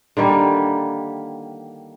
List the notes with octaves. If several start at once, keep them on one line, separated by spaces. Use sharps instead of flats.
D3 D#3 G3 A#3